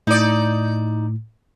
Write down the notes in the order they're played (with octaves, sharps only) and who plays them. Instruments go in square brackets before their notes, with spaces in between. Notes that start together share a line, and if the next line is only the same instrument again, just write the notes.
[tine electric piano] A2 [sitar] D#4 D5